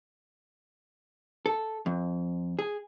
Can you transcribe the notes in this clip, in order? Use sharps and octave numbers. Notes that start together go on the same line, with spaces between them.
A4
F2
G#4